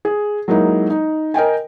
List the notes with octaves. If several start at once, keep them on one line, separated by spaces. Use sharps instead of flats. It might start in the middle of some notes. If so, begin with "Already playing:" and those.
G#4
F#3 G#3 A#3 D#4 E4
D#4
A#4 D#5 G5 G#5